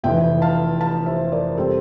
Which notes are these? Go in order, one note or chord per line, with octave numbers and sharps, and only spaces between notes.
F1 F2 E3 E5 G5
F5 A5
F5 A5
C5 E5
A#4 D5
C3 G3 C4 A4 C5